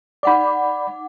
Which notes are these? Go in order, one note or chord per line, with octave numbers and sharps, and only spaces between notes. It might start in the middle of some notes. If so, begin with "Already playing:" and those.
D#4 D5 F#5 B5 D6